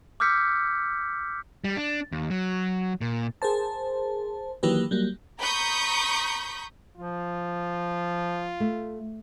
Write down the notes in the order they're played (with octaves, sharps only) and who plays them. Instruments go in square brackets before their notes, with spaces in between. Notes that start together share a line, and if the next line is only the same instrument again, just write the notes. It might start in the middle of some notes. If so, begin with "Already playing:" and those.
[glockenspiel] D6 E6 F6 G6 B6 C#7
[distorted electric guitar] G3
D4
D#2
F#3
A#2
[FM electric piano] G#4 A#4 C5 A5
D#3 E3 F#3 A#3 G4 B4
F#3 G3 A#3
[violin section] A#5 B5 C#6 D#6 G6
[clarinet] F3 [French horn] F4
[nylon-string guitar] A3